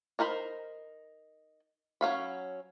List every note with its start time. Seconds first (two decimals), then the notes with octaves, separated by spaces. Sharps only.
0.19 D#4 A#4 C5 B5
2.01 F#3 C#4 F5 B5